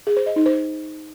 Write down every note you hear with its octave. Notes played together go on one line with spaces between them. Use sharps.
G#4
C5
D#5
D#4
C5